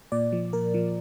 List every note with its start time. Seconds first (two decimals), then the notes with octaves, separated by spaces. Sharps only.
0.12 A#2 D5
0.32 F3
0.53 A#2 A#4
0.74 F3